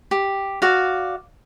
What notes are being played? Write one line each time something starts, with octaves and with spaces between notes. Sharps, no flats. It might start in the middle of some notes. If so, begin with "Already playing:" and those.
G4
F#4 D5 F5